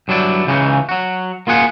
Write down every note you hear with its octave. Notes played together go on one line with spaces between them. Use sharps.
G2 F#3 D4 E4 D5
C#2 C#3 E3 C#4 D#4
F#3 F#4
A#3 F4 G#4 F#5